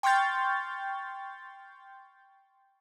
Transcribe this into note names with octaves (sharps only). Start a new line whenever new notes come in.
G5 C6 C#6 F6 G6 A6